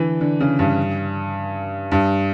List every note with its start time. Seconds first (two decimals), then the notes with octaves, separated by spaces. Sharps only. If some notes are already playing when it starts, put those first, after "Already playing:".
Already playing: D3 E3
0.21 D3
0.40 C#3
0.59 G2
1.92 G2